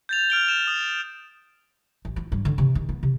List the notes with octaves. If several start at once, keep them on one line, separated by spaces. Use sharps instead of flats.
G6 A6 F7
F6 D7 G7
E7
D#6
A1
E4
G2
D3
C3
D#3
B3
C3